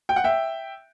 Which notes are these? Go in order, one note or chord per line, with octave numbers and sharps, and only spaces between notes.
G5
F#5
E5 G5